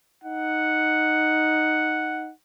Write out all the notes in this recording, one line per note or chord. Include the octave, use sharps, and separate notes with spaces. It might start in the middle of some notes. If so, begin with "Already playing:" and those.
D#4 F#5